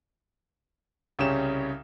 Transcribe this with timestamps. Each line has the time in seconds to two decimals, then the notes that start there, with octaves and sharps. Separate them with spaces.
1.19 C2 C#3 C#4 G4 E7